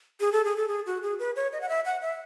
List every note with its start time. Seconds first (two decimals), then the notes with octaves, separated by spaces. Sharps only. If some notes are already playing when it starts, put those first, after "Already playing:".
0.20 G#4
0.32 A4
0.44 G#4
0.57 A4
0.68 G#4
0.86 F#4
1.03 G#4
1.19 B4
1.36 C#5
1.52 D#5
1.61 F#5
1.69 E5
1.85 F#5
2.02 E5